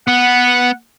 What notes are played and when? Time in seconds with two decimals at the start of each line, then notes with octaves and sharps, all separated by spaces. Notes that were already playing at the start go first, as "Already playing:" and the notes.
0.08 B3 F#5